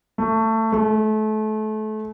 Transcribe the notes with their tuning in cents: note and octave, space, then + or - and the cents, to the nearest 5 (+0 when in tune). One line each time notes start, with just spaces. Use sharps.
A3 +20
A3 -30